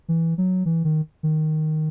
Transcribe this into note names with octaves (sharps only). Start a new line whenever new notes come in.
E3
F#3
E3
D#3
D#3